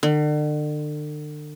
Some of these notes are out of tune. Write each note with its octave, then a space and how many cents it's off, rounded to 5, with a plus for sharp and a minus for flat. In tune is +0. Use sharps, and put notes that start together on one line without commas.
D3 +40